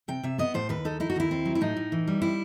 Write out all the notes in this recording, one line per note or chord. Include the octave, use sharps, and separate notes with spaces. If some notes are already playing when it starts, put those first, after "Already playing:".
C3 G5
C3 E5
B3 D#5
A2 C5
D#2 B4
D#4 A4
D#4 E4
F#4
D#2 E4
C4
F#3
E4
A2 D#4
A2
E3
G3
C4 E4